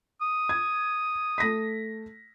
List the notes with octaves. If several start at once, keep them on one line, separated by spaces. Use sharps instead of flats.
D#6
G#6
A3 A#6 B6